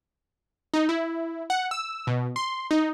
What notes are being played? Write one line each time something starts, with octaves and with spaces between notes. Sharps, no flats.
D#4
E4
F#5
E6
B2
C6
D#4